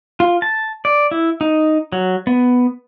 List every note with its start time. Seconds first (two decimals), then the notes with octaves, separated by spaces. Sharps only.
0.20 F4
0.42 A5
0.85 D5
1.11 E4
1.41 D#4
1.92 F#3
2.27 B3